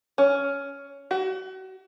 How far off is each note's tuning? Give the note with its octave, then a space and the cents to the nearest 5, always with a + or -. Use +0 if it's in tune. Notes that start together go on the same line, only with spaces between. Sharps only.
C#4 +10
F#4 +35